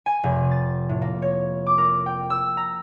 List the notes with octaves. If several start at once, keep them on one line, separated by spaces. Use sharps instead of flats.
G#5
F1
A6
A2
A#3
C#5
D6
A#4
G5
E6
A#5